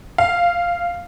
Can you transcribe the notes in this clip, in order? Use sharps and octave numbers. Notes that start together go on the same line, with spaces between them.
F5